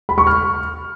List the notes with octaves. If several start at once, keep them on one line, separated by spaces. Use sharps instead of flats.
B5
C#6
F6